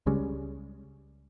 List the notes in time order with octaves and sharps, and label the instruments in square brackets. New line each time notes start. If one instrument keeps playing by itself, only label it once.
[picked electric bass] C#2 C#3 G3 G#3